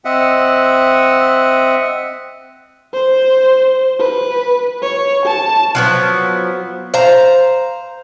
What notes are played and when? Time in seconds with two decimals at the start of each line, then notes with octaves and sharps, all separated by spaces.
0.05 C4 D#5 E5 F#5
2.93 C5
3.99 B4
4.82 C#5
5.26 A5
5.75 F3 F#3 B3
6.94 C5 F5 A#5